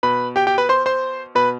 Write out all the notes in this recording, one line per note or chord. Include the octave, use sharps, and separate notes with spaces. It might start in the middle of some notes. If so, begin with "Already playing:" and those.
B2 B4 B5
G4 G5
G4 G5
B4 B5
C5 C6
C5 C6
B2 B4 B5